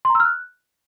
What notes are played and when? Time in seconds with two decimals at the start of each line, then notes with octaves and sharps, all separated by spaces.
0.05 C6
0.10 A#5
0.15 E6
0.20 F6
0.25 F#6